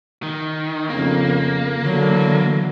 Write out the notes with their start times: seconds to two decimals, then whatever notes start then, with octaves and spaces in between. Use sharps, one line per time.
0.23 D#3
0.89 F2 C#3 A#3 B3
1.80 D3 E3 F#3